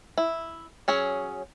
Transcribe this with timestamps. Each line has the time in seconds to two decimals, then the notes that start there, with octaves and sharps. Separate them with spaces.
0.18 E4
0.88 F#3 C#4 G#4